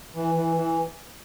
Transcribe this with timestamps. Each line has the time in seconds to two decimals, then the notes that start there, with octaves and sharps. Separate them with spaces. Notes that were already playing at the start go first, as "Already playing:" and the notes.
0.15 E3
0.35 E3
0.56 E3